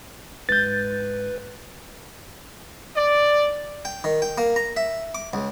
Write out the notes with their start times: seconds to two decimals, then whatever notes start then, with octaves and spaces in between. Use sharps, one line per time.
0.49 G#2 B4 G6 A6
2.96 D5
3.85 G5
4.04 D#3
4.22 G5
4.38 A#3
4.56 A#5
4.77 E5
5.15 D6
5.33 C#2